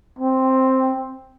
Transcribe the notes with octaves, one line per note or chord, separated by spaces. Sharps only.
C4